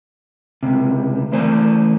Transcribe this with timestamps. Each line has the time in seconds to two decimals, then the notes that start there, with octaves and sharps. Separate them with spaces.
0.63 C#2 C3
1.32 E3 A3 C5 D5 G#5